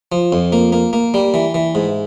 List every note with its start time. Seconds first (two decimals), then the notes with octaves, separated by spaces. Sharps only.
0.12 F3
0.32 F2
0.52 A#3
0.72 A#3
0.93 A#3
1.14 G3
1.34 E3
1.54 E3
1.75 G#2